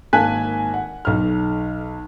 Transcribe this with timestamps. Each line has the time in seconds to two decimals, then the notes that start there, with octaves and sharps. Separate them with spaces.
0.13 G#1 A#3 G#5 A5 F#6 B6
0.74 F#5
1.05 B1 F6